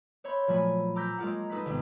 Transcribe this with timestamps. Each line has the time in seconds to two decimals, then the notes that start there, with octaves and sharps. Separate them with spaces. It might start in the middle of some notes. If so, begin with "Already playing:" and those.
0.24 C5 C#5 E5 B5 C6
0.47 A#2 F3 F#3 A3 G#5 B5
0.95 A#5 D6 E6 G6 A#6 B6
1.18 G#3 A#3 F4 A#4 F#5
1.50 D#4 A4 B4 D#6 B6
1.66 G#1 C3 B3 G4